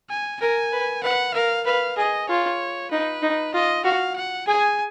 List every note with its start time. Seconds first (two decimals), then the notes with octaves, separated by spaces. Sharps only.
0.10 G#5
0.41 A#4 G#5
0.72 B4
1.03 B4 F#5
1.34 A#4 F5
1.65 B4 F5
1.97 G#4 D#5
2.29 F4 C#5
2.91 D#4 B4
3.22 D#4
3.54 F4 D#5
3.84 F#4 F5
4.16 F#5
4.47 G#4 G#5